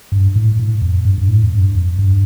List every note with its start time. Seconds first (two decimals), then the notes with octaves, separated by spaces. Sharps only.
0.12 G2
0.36 A2
0.59 A2
0.82 F2
1.05 G2
1.18 G2
1.28 A2
1.43 F2
1.53 G2
1.75 F2
1.99 G2